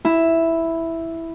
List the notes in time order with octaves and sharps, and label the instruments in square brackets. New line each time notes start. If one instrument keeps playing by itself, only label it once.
[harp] E4